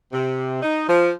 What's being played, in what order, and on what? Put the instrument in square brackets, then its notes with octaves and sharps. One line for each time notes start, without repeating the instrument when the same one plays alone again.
[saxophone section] C3
D#4
F3